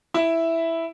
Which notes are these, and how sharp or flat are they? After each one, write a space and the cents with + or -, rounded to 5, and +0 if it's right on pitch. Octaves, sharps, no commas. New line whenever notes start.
E4 +0 E5 +0